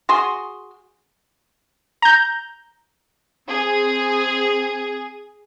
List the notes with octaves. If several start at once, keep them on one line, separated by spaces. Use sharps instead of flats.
F#4 G#4 C6
A#5 G6
C4 G#4